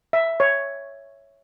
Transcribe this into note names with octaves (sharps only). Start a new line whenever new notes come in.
E5
C#5